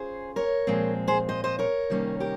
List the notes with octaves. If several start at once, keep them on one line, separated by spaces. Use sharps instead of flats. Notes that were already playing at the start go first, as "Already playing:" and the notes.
Already playing: C#4 F4 G#4 C5
A#4 C#5
A#2 F3 G#3 C4
G#4 C5
C5 D#5
C5 D#5
A#4 C#5
C3 D#3 G3 A#3 C#4
G4 A#4